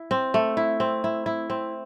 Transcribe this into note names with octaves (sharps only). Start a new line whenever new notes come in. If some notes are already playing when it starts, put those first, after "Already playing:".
Already playing: E4
C4
A3
E4
C4
E4
E4
C4